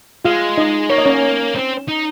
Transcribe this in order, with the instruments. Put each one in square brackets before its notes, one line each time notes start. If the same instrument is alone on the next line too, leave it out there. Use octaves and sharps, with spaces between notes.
[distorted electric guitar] G#3 [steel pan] F4 F5
[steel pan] D#4 D#5
[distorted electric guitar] A#3 [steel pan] C#5
[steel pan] D#5
C#4 C#5
[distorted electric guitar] C4
D#4